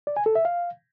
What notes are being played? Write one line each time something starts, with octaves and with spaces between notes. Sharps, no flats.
D5
G#5
A4
E5
F5